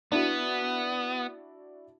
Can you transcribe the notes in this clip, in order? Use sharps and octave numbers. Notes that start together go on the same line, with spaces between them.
B3 D4 E4 F#4